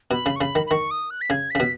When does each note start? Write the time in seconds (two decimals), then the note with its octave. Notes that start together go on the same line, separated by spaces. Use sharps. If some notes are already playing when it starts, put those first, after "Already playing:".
0.11 B2 B5
0.26 C#3
0.36 C#6
0.41 C#3 B5
0.55 D#3
0.66 B5
0.71 D#3 C#6
0.91 D#6
1.10 F#6
1.21 B6
1.30 C#3 G#6
1.51 C#3 B6
1.60 B2